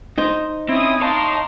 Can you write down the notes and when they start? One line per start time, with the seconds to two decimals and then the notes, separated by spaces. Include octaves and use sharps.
0.18 D#4 C5
0.69 C4 C#4 E4 D#6
1.01 D#4 C#5 F5 A5 A#5 C6